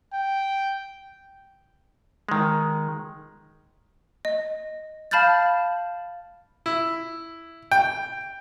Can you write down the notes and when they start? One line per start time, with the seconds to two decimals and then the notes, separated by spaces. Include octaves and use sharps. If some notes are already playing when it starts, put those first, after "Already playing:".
0.13 G5
2.29 D#3 G#3
4.25 D#5
5.11 F5 A5 B5 F6 G6 A6
6.66 E4
7.71 G5